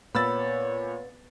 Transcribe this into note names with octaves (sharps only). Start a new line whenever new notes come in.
A#2 B3 C#5 B5 E6 A6